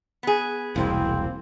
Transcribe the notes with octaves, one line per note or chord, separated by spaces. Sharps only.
B3 G#4
E1 C2 A#3 C4 E4